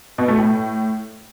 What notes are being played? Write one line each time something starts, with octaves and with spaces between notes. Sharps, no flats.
B2
A3
A2